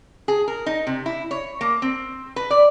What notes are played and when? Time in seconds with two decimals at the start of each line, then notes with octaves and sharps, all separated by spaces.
0.28 G#4
0.48 A#4
0.66 D#4
0.87 C3
1.06 E4
1.31 C#5
1.61 A#3
1.82 C4
2.36 B4
2.50 D5